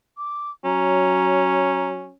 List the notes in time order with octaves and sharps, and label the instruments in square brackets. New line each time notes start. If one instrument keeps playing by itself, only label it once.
[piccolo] D6
[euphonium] F#3 [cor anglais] C#4 [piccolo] A#5